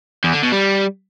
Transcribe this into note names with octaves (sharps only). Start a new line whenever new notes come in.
E2
D3
B2
G3